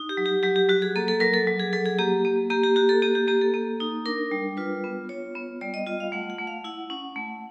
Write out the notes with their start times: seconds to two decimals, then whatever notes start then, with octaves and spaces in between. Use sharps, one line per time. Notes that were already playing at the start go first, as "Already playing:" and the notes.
Already playing: D#4
0.09 G4
0.17 F#3
0.26 G4
0.43 F#3 G4
0.56 G4
0.69 F#3 F#4
0.82 G#4
0.96 A#3 A4
1.08 A4
1.20 F#3 A#4
1.34 A4
1.47 F#3
1.59 G#4
1.73 F#3 A4
1.86 G#4
1.99 A#3 G4
2.25 A#3
2.50 A#3 G4
2.63 G4
2.76 F#4 G4
2.89 A4
3.02 A#3 G4
3.15 G4
3.27 A#3 G4
3.42 A4
3.54 A#3
3.80 D#4
4.06 D4 A#4
4.31 G3
4.57 F4 B4
4.84 B3
5.09 F4 C#5
5.35 B3
5.61 G3 D5
5.74 D#5
5.86 F4 D#5
6.00 F5
6.12 A3 F#5
6.30 F#5
6.39 A3
6.47 F5
6.64 E4 F#5
6.90 C#4
7.16 A3